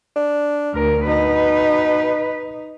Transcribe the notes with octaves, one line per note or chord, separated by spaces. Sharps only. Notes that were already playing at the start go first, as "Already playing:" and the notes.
D4
D2 A#4
B2 D#4 B4